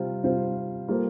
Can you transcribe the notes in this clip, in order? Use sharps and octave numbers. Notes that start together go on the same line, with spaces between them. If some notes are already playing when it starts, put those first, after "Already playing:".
Already playing: C3 G3 C4 F4 C5
C3 G3 C4 F4 C5
G3 A#3 F4 A4 C5